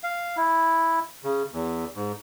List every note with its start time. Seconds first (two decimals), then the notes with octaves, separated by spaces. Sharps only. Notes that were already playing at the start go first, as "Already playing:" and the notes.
0.04 F5
0.37 E4
1.24 C#3
1.53 E2
1.95 G#2